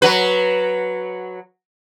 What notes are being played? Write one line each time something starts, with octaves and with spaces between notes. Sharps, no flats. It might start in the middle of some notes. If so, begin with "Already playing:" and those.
F#3 B4